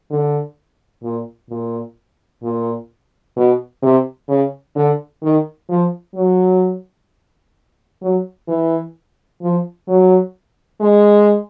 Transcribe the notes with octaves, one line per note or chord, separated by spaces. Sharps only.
D3
A#2
A#2
A#2
B2
C3
C#3
D3
D#3
F3
F#3
F#3
E3
F3
F#3
G#3